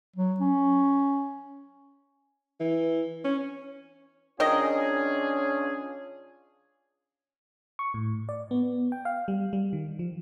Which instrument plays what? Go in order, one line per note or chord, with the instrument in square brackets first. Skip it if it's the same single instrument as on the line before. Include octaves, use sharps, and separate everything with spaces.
[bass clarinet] F#3
C#4
[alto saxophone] E3
C#4
[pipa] D#3 A#4 D#5 [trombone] C#4 [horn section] D4 F4 G#4
[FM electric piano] C#6
A2
D5
B3
G5
F5
G3
G3
D#3
F3